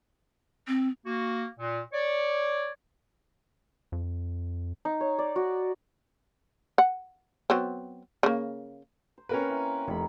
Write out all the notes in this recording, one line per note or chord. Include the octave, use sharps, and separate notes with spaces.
C4
A#3 F#4
A#2
C#5 D5
F2
D#4
C#5
D5
F#4
F#5
F#3 B3 C4
C#3 A#3
C5
A#3 C4 C#4 A#4 B4
E3
F1 D#3 B5